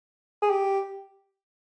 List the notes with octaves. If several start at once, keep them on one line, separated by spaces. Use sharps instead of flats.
G#4
G4